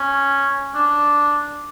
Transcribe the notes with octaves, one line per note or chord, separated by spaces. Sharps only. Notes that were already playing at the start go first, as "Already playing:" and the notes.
Already playing: C#4
D4